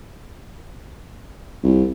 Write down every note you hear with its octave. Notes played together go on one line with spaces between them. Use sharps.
C2